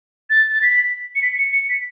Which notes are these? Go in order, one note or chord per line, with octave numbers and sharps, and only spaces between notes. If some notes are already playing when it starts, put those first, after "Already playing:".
A6
A6
B6
C#7
B6
C#7
C#7
B6